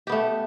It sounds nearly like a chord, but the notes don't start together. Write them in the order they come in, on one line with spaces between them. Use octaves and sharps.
G4 B3 A3